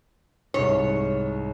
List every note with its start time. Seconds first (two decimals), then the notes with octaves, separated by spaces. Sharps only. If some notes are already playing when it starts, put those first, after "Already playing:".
0.54 C2 G#2 C#5